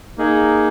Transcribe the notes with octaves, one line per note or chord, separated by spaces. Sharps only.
A#3 D#4 G#4